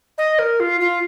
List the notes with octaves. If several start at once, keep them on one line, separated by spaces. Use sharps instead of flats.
D#5
A#4
F4
F4